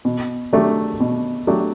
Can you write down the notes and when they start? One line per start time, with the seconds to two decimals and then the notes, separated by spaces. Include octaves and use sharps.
0.05 B2
0.53 F#3 A3 D4 G4
1.00 B2
1.47 F#3 A3 D4 G4